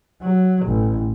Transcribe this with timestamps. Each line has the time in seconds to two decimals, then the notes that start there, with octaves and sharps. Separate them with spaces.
0.22 F#3
0.66 A1